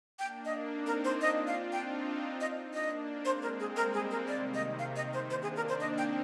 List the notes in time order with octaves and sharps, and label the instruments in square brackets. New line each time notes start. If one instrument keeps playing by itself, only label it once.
[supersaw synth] A#3 D4 [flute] G5
[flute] D#5
[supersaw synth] C4 D#4
[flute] A#4
C5
[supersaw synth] D4 F4 [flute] D#5
[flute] F5
[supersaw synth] C4 D#4 [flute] G5
[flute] D#5
[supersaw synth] A#3 D4 [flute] D#5
[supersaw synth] G#3 C4 [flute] C5
[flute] A#4
G#4
[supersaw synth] G3 A#3 [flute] A#4
[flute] G#4
A#4
[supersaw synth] C3 D#3 [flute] D5
[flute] D#5
F5
D#5
C5
[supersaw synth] A#3 D4 [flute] C5
[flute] G#4
A#4
C5
[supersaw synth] C4 D#4 [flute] D#5
[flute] G5